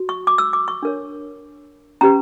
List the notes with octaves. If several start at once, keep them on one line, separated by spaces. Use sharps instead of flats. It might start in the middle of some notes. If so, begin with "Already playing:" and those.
Already playing: F#4
C#6
D6
E6
D6
C#6
D4 A#4 C#5
C#4 G4 B4 A#5